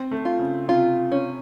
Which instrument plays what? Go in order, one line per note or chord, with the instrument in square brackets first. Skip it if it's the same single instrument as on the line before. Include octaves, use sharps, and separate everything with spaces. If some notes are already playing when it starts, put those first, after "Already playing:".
Already playing: [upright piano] C4
A3
[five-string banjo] F4
[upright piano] C#3
[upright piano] C3 [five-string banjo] F4
[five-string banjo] C#4